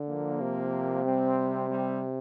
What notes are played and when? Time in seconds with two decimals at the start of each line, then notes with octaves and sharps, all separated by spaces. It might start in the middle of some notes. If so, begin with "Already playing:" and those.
Already playing: D3
0.09 F3 A#3
0.41 C3
1.05 G3 C4
1.69 G3 C4